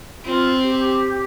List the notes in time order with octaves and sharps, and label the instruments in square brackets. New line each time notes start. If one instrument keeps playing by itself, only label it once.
[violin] C4 [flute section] F4
[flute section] G4